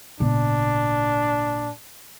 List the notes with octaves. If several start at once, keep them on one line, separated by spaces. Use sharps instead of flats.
G#1 A#2 C#3 B3 D4